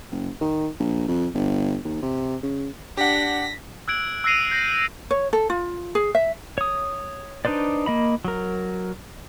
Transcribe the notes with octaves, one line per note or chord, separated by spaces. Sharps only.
F#1
D#3
A#1
F2
G1
D#2
C3
C#3
D4 G4 F#5 A#6 B6
E6 F#6 G#6 D7 F#7
E6 F#6 A#6 C7 D#7 F7
G6 A#6
C#5
A4
F4
G#4
E5
C#5 D#6
D4 D#4 B4 C5 D5
A#3 D#5 B5
F#3 A#4